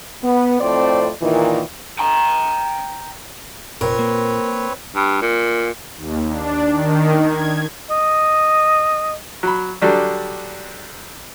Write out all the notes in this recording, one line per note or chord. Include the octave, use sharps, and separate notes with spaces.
B3
F2 A2 A3 C4 C5 D5
A#2 D#3 E3
G5 A#5
F1 A#2 C4 A#4 B4 C#5
A#3
G2
A#2
D#2
D4
D#3
G#6
D#5
F#3 B5
D3 F#3 G3 D4